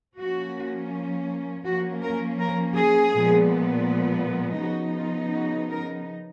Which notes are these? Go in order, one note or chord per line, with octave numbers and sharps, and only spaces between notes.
F3 A#3 C#4 F#4
F3 A#3 C#4 F#4
A#4
A#4
G#4
A#2 F3 G#3 B3
C#3 F3 B3 D#4 F#4
F4
F#4
A#4